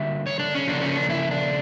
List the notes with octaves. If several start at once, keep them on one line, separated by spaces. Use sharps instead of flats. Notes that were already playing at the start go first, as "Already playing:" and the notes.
Already playing: D3 G3 A#3 E5
C#5
D4
C#4
C#3 F3 A#3 D4
C#4
D4
E4
D4